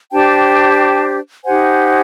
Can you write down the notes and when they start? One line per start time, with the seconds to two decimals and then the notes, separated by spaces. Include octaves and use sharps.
0.12 D4 G4 C5 G5 A5
1.44 D#4 G4 C5 F#5 G#5